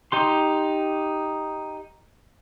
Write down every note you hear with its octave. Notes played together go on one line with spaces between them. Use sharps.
D#4 G4 C6